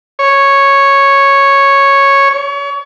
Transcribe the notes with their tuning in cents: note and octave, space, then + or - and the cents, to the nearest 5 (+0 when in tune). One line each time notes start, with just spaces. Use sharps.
C#5 -5
C#5 +30